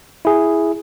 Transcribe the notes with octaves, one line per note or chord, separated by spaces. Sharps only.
E4 G#4